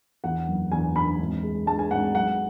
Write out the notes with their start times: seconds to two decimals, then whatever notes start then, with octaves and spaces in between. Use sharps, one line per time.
0.24 E2 F#5
0.48 F#1
0.71 E2 G#5
0.95 E2 B5
1.18 G#1
1.43 G#3
1.66 G#3 A5
1.79 G#5
1.91 G#1 F#5
2.14 B1 F#5